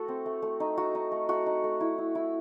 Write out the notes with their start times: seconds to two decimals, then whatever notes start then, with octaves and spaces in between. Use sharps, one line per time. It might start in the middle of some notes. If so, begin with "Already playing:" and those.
Already playing: A3 F#4 A4
0.08 C4
0.26 A3
0.42 A3
0.60 D#4
0.77 D#4 F#4
0.95 D#4
1.12 A3
1.29 A3 F#4
1.46 D#4
1.64 A3
1.81 E4
1.98 E4
2.15 E4